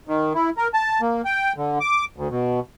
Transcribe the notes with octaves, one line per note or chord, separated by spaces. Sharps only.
D#3
E4
A#4
A5
A#3
G5
D3
D6
D2
B2